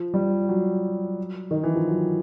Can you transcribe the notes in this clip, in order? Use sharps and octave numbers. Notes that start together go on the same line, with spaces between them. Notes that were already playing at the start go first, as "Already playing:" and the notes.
Already playing: F3
G3
F#3
D#3
E3
F3
F#3